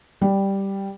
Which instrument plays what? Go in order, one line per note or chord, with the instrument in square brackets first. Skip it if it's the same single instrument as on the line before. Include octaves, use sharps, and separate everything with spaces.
[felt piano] G3